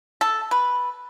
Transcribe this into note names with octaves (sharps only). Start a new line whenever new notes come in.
A4
B4